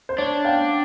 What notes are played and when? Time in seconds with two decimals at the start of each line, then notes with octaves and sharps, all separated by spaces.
0.09 C5
0.18 D4 C#5
0.45 F5 G5